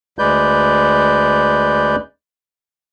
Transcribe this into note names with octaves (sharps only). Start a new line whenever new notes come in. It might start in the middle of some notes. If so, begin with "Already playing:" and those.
D2 G#3 B4 D5 G6